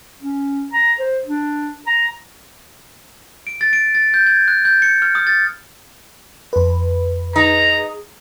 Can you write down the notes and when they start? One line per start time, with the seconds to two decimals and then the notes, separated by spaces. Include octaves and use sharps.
0.23 C#4
0.73 A#5
0.99 C5
1.25 D4
1.87 A#5
3.47 D7
3.61 A6
3.73 D7
3.95 A6
4.14 G6
4.27 G#6
4.48 F#6
4.65 G6
4.82 C#7
5.02 F6
5.15 D#6
5.27 A6
6.53 F2 B4
7.36 D#4 G#4 A#5